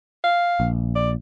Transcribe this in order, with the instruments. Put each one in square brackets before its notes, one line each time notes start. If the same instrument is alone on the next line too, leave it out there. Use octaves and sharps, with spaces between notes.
[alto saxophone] F5
[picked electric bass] A#1
[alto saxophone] D5